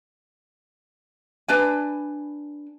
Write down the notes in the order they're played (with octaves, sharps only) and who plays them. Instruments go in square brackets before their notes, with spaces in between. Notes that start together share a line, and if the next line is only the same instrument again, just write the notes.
[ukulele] D4 B4 G#5